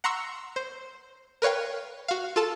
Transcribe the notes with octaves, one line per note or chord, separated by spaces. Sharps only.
F#5 A#5 C6 C#6 E6
C5
A#4 B4 C#5 F5 G5
F#4 F5
F4 A4 A5